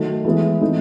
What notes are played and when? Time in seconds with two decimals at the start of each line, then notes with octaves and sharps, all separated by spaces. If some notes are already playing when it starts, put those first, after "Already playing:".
Already playing: D#3 F#3 A3
0.25 E3 G#3 B3 E4
0.61 E3 A3 C4 D#4